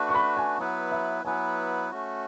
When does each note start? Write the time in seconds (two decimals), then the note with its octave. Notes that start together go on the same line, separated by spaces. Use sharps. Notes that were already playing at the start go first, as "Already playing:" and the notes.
Already playing: A3 D4 F#4 B4
0.09 C#6
0.15 B5
0.37 G#5
0.58 F#3 B3 E4 B4 F#5
0.92 E5
1.25 F#3 B3 E4 B4 G#5
1.91 A3 C#4 F#4